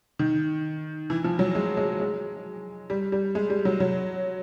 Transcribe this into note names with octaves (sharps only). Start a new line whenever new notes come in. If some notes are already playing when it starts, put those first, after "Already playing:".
D#3
E3
F3
F#3
G#3
G#3
G#3
G3
G3
G#3
G3
F#3
F#3